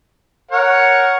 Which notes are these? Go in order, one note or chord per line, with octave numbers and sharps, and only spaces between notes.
A#4 C#5 F#5